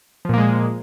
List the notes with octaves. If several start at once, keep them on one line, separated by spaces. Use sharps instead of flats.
A#2 F3 G#3 A#3